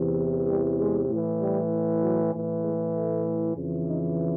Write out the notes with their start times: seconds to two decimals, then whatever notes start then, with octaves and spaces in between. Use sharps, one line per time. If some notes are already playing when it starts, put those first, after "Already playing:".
Already playing: E2 C3 E3
0.48 G3
0.79 G#3
1.10 A2 E3
1.41 G3
2.02 F#3
2.34 A2 E3
2.63 G#3
2.94 A3
3.56 F2 C#3 E3
3.87 D#4